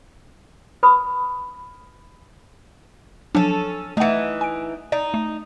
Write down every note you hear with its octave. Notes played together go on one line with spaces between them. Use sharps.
B4 B5 D#6
F3 F#3 C#4 D4 A4
E3 A3 D#4 F#5
G#5 D7
D#4 D5
A3